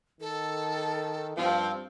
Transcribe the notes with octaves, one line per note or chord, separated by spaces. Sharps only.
D#3 A4
G2 F3 C4 F5